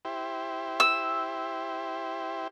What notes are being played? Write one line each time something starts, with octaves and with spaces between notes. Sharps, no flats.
E4 G4 C5
E6